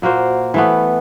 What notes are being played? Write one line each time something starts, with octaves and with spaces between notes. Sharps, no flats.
A#2 A#3 F#4 C5
E3 A3 B3